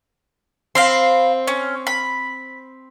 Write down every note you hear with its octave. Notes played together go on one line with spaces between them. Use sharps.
C4 F5 B5 C6
C#4
B5